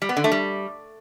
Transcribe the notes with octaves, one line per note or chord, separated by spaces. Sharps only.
G3
B3
D3
A3
G3